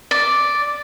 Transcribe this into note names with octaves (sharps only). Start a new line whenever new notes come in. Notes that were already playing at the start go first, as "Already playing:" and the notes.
D5